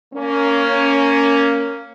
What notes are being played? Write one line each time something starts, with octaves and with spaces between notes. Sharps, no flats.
A#3 C#4